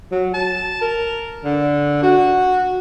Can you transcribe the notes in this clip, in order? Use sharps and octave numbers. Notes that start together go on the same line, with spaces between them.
F#3
A5
A#4
D3
F#4